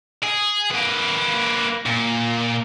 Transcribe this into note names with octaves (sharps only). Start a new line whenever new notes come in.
G#4
A#3 B4
A#2